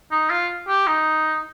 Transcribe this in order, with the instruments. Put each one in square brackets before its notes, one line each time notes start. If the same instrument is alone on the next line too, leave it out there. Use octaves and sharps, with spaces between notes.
[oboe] D#4
F4
G4
D#4